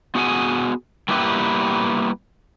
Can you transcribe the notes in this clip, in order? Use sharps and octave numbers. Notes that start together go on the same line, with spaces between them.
B3 F#4 G#4 F#5 G#5
G3 A#3 B3 E4 G4 B4